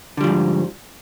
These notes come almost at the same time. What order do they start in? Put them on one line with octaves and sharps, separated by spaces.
D3 G3 F3 G#2